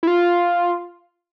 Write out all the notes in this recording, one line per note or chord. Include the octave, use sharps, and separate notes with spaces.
E4
F4